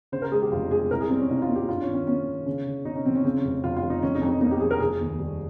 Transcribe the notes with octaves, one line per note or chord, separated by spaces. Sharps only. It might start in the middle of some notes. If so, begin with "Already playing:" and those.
C#3 C5
A#4
G#3 G#4
G4
F1 F4
G#3 G#4
C2 A#4
G#4
G3 C4
C#4
C2 D#4
F4
A#3
G4
G2 F4
C#4
D#3
C#4
A#3 C#4
D#3
C#3
C#3
C#3 D#4
C#4
F3 C4
C#4
C#3 C4
C#4
F1
F1 F4
F4
F1
D#4
F2 C#4
D#4
F2
D#4
A#3 D#4
G4
F3 G#4
A#4
F1 G#4
D#2
G3